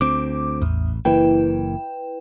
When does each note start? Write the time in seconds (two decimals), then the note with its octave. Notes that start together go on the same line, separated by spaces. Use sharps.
0.01 D2 C4 D6
0.62 A1 E2
1.05 F#1 E3 A#3 E4 B4 G5